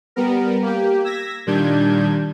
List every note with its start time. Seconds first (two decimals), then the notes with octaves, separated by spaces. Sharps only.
0.16 G3 B3 A#4
0.63 A#3 G4
1.04 E6 G#6 A#6 B6
1.46 A#2 D#3 G3 D4 G6 G#6